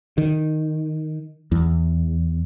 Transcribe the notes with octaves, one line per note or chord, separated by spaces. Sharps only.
D#3
E2